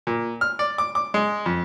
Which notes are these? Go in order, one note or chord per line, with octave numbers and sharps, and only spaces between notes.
A#2
F6
D5
D6
D6
G#3
F2